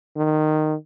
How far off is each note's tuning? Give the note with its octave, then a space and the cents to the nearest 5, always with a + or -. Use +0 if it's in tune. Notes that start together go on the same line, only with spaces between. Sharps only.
D#3 -15